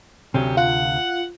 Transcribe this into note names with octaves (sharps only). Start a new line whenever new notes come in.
D2 C3 F#3 C#4 G4
F4 F#5